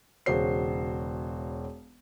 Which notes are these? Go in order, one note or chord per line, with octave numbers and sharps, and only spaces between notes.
E1 C#3 F#4 C5 C7